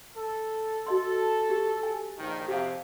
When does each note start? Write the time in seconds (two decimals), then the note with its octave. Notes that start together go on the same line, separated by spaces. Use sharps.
0.16 A4
0.86 F#4 A4 D#5 C6
1.50 G4
1.83 G#5
2.18 A#1 D#3
2.48 F2 C3 G4 F5